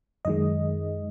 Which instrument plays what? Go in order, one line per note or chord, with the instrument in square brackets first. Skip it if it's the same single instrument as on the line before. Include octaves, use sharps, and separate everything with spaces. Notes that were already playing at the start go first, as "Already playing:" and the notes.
[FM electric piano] F#2 D#3 G#3 D#5